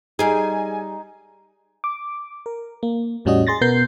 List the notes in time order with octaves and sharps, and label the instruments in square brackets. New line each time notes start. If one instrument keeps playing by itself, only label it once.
[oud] G3 G#4 [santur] D#4 [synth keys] G#5
[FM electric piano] D6
A#4
A#3
E2 A2 G3 C#4 F#4 D#5
G#4 C6 A6 A#6
B2 B3 A#4 G6 C7